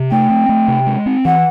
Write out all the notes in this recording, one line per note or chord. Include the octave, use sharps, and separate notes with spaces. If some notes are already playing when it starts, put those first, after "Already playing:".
Already playing: C3
A3 G5
C4
A3
C3
G#3
C4
E3 F#5